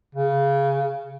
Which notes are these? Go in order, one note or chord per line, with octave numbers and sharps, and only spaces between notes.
C#3